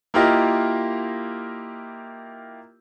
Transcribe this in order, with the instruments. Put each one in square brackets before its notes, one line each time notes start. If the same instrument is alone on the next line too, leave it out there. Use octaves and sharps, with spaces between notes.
[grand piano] A#3 E4 F4 G4 A#4 D#5